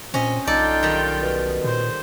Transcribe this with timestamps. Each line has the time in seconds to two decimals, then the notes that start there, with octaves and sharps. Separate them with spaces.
0.14 A#2 C4 C#4 D#5
0.47 B1 D#4 F4 A4 D5 G5
0.83 D#3 G3
1.22 B2
1.64 A#2 C5